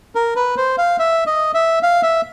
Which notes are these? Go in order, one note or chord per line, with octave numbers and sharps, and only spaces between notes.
A#4
B4
C5
F5
E5
D#5
E5
F5
E5